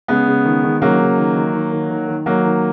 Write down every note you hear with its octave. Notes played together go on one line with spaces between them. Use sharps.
C#3 G#3 B3
C#3
D#3
D#3
C#3 F#3 A#3
C#3
D#3
D#3
D#3
D#3
D#3
D#3
D#3 F#3 A#3
D#3